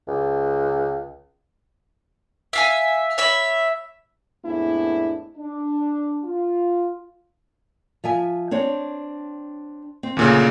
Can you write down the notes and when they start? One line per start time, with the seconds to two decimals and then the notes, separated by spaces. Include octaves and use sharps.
0.07 C#2
2.53 E5 F5 G#5
3.18 C#5 E5 B5
4.45 F2 A2 G#3 B3 D4 E4
5.37 D4
6.25 F4
8.04 F3 E5 G#5
8.51 C4 D4 C#5
10.03 C4
10.17 D2 A#2 C#3